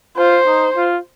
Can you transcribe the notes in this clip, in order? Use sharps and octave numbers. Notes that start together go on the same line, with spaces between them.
F4 C5
D#4
F4